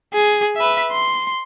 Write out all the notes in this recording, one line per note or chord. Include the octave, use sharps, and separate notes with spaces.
G#4
B4 E5
C6